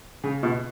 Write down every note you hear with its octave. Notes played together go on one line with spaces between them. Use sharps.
C#3
B2